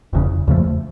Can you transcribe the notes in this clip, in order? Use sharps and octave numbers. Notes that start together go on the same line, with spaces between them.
F1 E2 C#3
E2 C#3 F3 A3